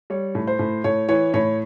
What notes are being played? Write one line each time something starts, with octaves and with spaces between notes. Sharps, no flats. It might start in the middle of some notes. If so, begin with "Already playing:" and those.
G3 C#5
A2
C5
A2
A2 C#5
E3 C#5
A2 C#5